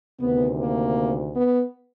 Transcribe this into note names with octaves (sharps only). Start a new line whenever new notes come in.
D2 C3 D#3 B3
A#3
B3